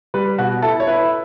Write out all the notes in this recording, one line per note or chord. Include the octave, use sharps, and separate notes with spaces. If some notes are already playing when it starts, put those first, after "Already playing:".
G3 B4
B2 F#4
E4 A4
C#5
E4 B4